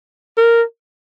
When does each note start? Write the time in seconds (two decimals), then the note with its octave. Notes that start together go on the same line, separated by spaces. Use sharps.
0.37 A#4